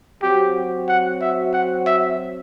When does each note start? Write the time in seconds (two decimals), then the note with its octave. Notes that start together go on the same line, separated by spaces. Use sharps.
0.22 F#3 C4 F#4 G4
0.88 F#5
1.21 E5
1.53 F#5
1.87 E5